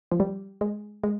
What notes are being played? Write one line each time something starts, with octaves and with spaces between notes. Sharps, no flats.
F3
G3
G#3
G#3